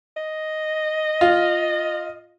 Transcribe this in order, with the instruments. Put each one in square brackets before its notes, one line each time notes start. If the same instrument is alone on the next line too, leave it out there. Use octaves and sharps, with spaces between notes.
[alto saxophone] D#5
[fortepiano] F4